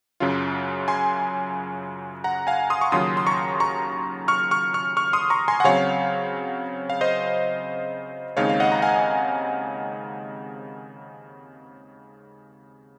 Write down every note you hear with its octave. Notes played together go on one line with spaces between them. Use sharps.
F#2 C#3 F#3 C#4 F4
G#5 C6
F#5 A#5
F5 G#5
C6 D#6
C#6
D#2 C#3 F#3 C#4 F4 C6 D#6
C6
A#5 C#6
A#5 C#6
C#6 F6
C#6 F6
C#6 F6
C#6 F6
C6 D#6
A#5 C#6
G#5 C6
F#5
C#3 F#3 C4 C#5 F5
F5
C5 D#5
D#2 C#3 G#3 C4 D#4 C#5 F5
F5
D#5 F#5
A#5
F5 G#5